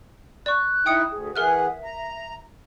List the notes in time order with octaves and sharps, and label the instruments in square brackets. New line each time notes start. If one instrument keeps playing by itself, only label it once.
[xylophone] D5 C#6 [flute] F#6
[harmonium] D#4 E4 [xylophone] G5 D#6 C#7
[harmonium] D2 [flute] G#4
[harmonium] E3 G#4 F#5 [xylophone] A#4 F6 F#6 [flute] E5
[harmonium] A#5